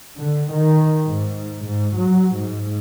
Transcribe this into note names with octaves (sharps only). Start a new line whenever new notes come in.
D3
D#3
G#2
G#2
F#3
G#2